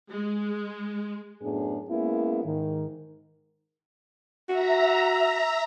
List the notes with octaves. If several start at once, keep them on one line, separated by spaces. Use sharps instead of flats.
G#3
F#2 A2 B3 D4 G#4
G#3 A#3 B3 C#4 E4
G#2 D#3
F#4 E5 A#5